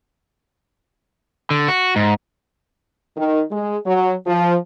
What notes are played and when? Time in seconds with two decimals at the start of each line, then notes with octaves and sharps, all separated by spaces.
1.50 D3
1.68 F#4
1.96 G#2
3.17 D#3
3.51 G#3
3.85 F#3
4.27 F3